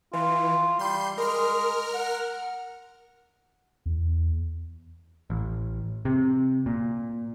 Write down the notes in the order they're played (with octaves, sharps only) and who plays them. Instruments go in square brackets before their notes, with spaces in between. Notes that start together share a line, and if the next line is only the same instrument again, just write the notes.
[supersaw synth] E3 [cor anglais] F4
[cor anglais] G3 [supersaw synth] C6 G6
[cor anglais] G#3 [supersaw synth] A#4 F6
[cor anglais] F#5
[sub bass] E2
[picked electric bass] A1
C3
A#2